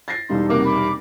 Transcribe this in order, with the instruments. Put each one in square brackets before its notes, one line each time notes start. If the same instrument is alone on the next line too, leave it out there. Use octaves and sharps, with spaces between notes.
[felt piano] A6 A#6 C7
[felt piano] E1 G3 D#4 [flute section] A4 F5 C6
[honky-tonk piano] C3 A#3 [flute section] F#4 F#5 D6
[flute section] B5 D6